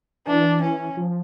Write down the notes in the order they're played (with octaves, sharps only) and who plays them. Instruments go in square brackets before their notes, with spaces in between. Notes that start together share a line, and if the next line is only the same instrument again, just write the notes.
[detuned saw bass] E3 [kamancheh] D4
[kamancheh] C#4
[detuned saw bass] F3